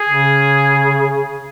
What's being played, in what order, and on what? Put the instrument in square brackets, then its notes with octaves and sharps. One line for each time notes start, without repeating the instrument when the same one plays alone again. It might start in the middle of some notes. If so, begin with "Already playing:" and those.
Already playing: [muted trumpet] G#4
[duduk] C#3